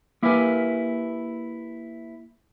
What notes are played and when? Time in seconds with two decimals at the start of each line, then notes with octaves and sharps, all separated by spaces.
0.23 A#3 E4 G4 A#4 B4 G#5